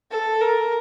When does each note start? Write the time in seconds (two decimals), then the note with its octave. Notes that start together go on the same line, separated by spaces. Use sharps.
0.11 A4
0.41 A#4